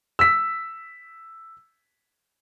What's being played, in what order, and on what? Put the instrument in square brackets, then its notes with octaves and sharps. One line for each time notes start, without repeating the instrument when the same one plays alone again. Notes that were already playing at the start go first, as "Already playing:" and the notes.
[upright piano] E6 B6